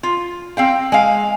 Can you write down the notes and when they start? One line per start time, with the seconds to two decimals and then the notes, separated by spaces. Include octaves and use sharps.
0.03 F4
0.57 C4 F5 G5
0.92 G#3 F5